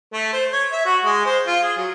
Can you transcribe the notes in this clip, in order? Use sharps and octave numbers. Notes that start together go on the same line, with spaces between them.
A3
C5
C#5
E5
F#4
G#3
C5
F4
G#4
F#3